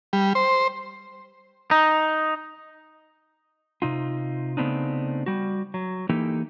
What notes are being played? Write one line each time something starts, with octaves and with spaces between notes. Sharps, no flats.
G3
C5
D#4
C3 D#4 F4
C#3 A3 B3 C4 D4 D#4
G3 F#4
F#3
E3 A#3 D#4 G4 A4